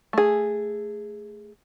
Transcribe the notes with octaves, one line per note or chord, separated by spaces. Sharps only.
A3 G#4